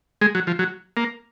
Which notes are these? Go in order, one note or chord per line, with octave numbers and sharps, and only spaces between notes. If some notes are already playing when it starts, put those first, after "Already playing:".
G#3
F#3
F3
F#3
A#3